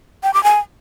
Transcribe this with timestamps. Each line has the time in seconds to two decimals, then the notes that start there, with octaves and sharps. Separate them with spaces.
0.23 G5
0.34 D6
0.44 G#5